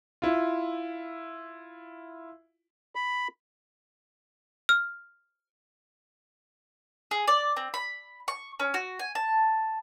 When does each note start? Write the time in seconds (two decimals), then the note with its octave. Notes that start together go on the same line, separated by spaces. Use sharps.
0.22 E4 F4
2.95 B5
4.69 F6
7.11 G#4
7.28 D5
7.57 C4
7.74 B5
8.28 C#6
8.60 C#4
8.74 F#4
8.99 G#5
9.15 A5